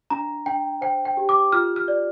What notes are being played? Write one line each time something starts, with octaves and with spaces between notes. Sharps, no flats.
D4 A#5
D4 G5
C5 G5
G5
G4
D6
F4 F6
F6
D5